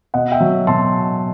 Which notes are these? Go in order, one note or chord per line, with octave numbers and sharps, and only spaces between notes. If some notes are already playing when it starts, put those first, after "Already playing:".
B2 D#5 F#5
E5 G5
F#3
B2 A5 C6